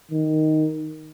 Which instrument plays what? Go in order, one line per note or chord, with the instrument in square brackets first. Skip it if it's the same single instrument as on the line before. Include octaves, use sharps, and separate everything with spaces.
[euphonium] D#3